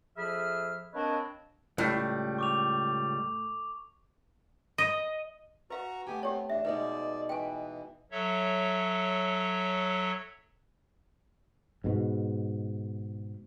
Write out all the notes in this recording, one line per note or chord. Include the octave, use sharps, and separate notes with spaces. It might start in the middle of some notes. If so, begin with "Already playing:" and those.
F2 F3 G#4 E5 B5 F6
A#3 C4 D4 B4 C#5 D#5
C#2 A2 G3
C#6 D6 F7
D#5
F#4 B4 F5 A#5 C#6
A3 B3 G4 G5 G#5
B3 C4 G4 C#5
E2 D4 E5
B2 G#3 D#4 B4 D5
E3 B4 G5 G#5
F#3 A4 C#5 E5
G#2 B2